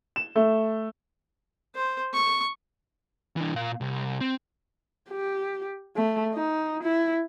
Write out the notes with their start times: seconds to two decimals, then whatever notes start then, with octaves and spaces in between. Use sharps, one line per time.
0.16 E7
0.36 A3
1.76 C5
2.14 C#6
3.36 E3 D4
3.55 A#2 F5
3.81 C2
4.21 C4
5.10 G4
5.96 A3
6.34 D#4
6.83 E4